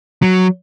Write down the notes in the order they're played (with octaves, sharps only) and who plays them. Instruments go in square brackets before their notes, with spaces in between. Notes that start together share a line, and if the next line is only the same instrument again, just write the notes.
[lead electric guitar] F#3